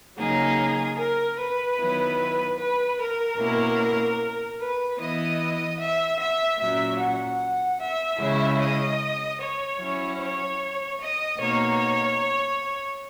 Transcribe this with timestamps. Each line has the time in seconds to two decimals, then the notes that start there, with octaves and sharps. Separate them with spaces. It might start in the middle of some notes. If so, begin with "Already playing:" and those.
0.17 C#3 F#3 A#3 D#4 G#4
0.98 A#4
1.38 B4
1.78 D#3 F#3 B3 E4
2.58 B4
2.98 A#4
3.38 B2 A#3 C#4 E4
4.59 B4
4.99 E3 B3 E4 D#5
5.79 E5
6.19 E5
6.59 A#2 F#3 C#4 E5
6.98 F#5
7.79 E5
8.19 C#3 G#3 C#4 E4
8.59 D#5
9.39 C#5
9.79 F#3 C#4 E4
10.19 C#5
11.00 D#5
11.39 B2 A#3 D#4 C#5